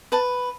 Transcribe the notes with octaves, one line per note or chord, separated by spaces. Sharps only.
B4 A5